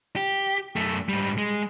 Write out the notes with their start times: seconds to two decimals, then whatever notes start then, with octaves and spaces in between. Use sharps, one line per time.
0.16 G4
0.76 F#2 A3
1.09 G#2 G3
1.38 G#3